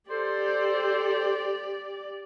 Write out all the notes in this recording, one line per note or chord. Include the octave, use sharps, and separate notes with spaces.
G4 A4 C5 D5